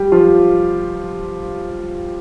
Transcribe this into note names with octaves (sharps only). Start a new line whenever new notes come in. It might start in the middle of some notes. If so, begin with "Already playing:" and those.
Already playing: G3 G4
F3 F4